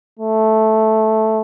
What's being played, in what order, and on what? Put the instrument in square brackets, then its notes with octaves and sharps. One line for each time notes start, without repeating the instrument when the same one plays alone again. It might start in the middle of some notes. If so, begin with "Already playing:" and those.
[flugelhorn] A3